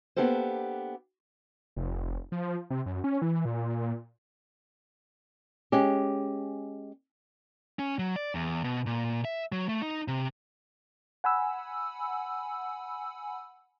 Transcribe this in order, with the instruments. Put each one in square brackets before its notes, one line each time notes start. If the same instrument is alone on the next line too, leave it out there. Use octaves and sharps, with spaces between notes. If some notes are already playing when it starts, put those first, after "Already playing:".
[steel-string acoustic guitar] A#3 B3 D4 G4 A4 C5
[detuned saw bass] F1
F3
C3
F#2
C#4
E3
A#2
[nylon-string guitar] G#3 C#4 G4
[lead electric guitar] C#4
F#3
D5
E2
B2
A#2
E5
F#3
A3
D#4
C3
[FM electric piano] F#5 G#5 B5 E6